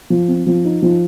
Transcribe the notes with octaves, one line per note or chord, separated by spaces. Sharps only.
F3
C4
F3
D#4
F3